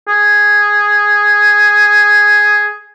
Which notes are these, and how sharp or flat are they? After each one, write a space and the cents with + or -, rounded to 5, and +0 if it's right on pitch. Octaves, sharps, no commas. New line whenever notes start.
G#4 +0